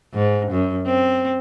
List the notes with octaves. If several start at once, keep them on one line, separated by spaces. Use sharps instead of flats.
G#2
F#2
C4